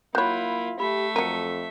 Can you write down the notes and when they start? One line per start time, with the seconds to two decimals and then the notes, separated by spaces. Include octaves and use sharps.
0.15 F#3 A#3 E4 F4 C#5 B5 F#6 G6
0.80 A3 G4 E5 B5
1.16 F2 F#3 A#4 C#7 D#7